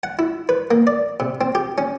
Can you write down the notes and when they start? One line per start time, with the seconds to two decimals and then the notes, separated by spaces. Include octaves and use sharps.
0.03 F#5
0.19 E4
0.49 B4
0.71 A#3
0.87 D5
1.20 C3
1.41 C4
1.55 G4
1.78 C#4